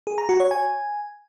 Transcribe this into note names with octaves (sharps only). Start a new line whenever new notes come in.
G#4
A#5
F#4
C#5
G#5